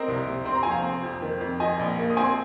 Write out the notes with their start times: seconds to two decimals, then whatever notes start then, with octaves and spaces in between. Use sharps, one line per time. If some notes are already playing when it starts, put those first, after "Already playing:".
Already playing: C4 A#4 D#5
0.08 C2
0.26 C3
0.45 C4 C6
0.55 A#5
0.63 F3 G#5
0.71 F5 A#5
0.84 C4
1.03 F2
1.22 D#3
1.41 F2
1.60 F3 D#5 G#5
1.79 A#1
1.99 A#3
2.10 D#6
2.17 C4 G#5 C6